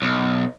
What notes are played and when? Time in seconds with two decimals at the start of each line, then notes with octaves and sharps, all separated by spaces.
0.02 B1